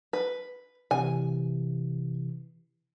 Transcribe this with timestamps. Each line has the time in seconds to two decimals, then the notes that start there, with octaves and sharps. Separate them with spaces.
0.13 B4
0.91 C3 E3 G#5